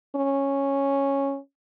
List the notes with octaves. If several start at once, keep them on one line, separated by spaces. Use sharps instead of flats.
C#4